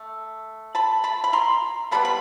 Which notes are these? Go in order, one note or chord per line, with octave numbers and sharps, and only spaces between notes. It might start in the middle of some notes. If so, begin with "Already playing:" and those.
Already playing: A3
A5 B5
A5 B5
B5
A#5 C6
D#3 G3 B3 A5 B5
B5